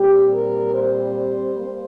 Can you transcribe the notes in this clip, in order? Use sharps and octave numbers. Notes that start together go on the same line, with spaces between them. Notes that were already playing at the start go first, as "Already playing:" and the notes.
Already playing: A#2 G3 C4 G4
A#4
C5
G3 A#3